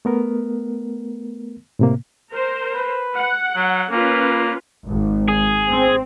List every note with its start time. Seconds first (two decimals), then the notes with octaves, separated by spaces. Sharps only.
0.05 A3 B3 A#4
1.79 A2 C3 A#3
2.32 A#4 C5
2.74 B4
3.17 F#5
3.56 F#3
3.90 A#3 C#4 F4 B4
4.88 G#1
5.28 G#4
5.70 C4